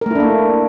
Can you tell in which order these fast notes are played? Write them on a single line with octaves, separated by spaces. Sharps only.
A#4 A3 E4 D4 A#3